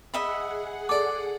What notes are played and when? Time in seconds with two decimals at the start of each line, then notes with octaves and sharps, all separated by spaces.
0.14 G#4 D#5 E5 F#5 B5
0.89 A4 D5 D6